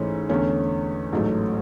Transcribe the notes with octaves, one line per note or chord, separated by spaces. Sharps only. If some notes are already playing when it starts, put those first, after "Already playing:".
Already playing: G#2 E3 A3 C#4
E2 D3 A3 C#4
A1 G#2 F#3 A3